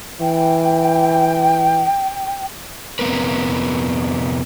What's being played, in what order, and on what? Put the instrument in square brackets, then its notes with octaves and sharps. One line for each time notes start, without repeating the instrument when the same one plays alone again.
[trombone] E3 [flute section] G5
[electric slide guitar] F2 C3 G#3 B3 A#4 B4